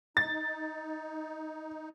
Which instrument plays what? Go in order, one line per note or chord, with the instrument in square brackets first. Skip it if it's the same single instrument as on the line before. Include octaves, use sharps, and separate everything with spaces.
[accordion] D#4 [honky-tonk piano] A6